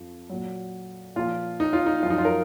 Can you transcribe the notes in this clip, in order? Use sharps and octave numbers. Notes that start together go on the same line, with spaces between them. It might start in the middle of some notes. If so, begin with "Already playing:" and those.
Already playing: F2 F3
A#2 F#3
A#2 F3 F4
D#4
F4
D#4
F#2 F3 D#4 F4
F4
A#4